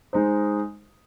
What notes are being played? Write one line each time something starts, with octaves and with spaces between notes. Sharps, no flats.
G#3 D#4 C5